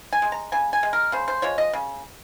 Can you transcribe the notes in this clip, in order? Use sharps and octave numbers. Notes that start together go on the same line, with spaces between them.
G#5
G#3
A#5
C#3 G#5
G#5
G#3
A#4
C#3 C5
C5
F3 G#3 C#5
D#5
C#3